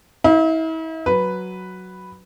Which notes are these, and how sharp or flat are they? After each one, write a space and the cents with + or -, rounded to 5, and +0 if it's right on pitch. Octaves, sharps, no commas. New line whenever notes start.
E4 -40 F5 +0
F#3 +0 B4 +0